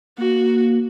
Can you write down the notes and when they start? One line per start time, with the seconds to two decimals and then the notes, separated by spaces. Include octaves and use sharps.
0.18 A#3 F#4